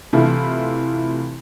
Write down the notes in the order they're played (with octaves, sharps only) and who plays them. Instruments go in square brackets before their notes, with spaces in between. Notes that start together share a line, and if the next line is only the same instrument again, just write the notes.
[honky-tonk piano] C3 E3 A3 E4 F4